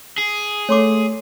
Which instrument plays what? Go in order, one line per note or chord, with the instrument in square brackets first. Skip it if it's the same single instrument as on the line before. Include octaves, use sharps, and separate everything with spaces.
[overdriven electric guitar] G#4
[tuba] A3 [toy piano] C#5 C6 D6